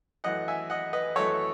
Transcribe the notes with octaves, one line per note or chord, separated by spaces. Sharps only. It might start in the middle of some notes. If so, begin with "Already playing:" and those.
F#2 E3 A3 D#5 F#5
E5 G#5
D#5 F#5
B4 D#5
F#2 E3 A3 A4 C#5